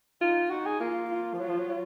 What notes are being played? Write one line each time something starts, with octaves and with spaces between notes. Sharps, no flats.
D#4 F4
D#4 F#4
G#4
A#3 F4
F4
F3
F#3 F4
F3
F#3
F#3